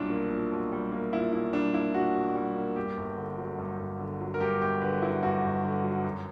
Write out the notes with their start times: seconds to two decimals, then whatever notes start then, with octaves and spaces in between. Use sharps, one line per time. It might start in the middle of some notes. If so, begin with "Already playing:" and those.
Already playing: B1 A#2 G3 D4 E4
0.10 A#3
0.31 A#2
0.51 B1
0.72 G3
0.92 A#3
1.13 A#2 E4
1.33 B1 E4
1.53 G3 D4
1.74 A#3 E4
1.94 A#2 F#4
2.15 B1
2.35 G3
2.56 A#3
2.76 G2 G4
2.97 G1
3.17 D3
3.38 F#3
3.58 G2
3.79 G1
3.99 D3
4.21 F#3
4.34 A#4
4.40 G2 G4
4.61 G1 G4
4.82 D3 B4
5.02 F#3 E4
5.23 G2 F#4
5.44 G1
5.63 D3
5.84 F#3
6.05 F#2